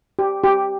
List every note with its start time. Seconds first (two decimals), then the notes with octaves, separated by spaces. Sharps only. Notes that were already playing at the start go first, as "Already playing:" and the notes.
0.19 G4
0.44 G4